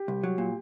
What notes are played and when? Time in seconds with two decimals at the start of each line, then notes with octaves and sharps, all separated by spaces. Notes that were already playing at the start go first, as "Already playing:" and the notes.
Already playing: G4
0.08 C2
0.23 F#3
0.38 A#2